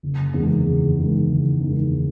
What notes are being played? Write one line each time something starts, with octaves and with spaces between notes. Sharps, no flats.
F#1
E2 D#3 G#3
F#1
E2 D#3 G#3
F#1
E2 D#3 G#3